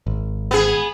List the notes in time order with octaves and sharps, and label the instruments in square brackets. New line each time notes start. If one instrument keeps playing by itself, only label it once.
[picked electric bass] G#1
[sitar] B3 G#4